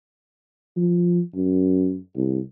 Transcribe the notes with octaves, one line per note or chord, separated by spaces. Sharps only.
F3
F#2
C2